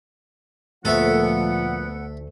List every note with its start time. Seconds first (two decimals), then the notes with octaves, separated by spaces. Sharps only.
0.85 D2 A#2 F3 A3 B3 A4 E5 F#5